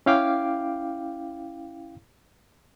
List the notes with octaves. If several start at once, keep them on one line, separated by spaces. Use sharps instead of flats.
C#4 E4 F5 G5 D6